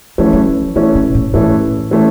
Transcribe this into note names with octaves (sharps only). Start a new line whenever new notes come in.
E3 F3 A3 C#4
F#3
C#3 E3 A3 C#4
C3
A2
A2 E3 A3 C#4
E3 A3 C#4